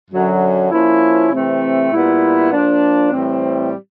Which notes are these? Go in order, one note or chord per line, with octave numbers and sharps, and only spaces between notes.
F#2 D3 F#3
F3 A#3 C#4 E4
C3 E3 A3 C4
A#2 G3 B3 E4
F3 A#3 D4
A2 E3 G3 C4